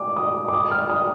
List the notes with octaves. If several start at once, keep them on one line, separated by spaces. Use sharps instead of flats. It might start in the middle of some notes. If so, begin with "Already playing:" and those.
Already playing: D6
D#6
D6
D#6
F6
D#6